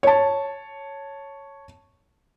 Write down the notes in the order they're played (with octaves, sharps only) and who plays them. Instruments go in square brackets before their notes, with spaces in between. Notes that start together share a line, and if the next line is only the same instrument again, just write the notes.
[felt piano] C#5 A5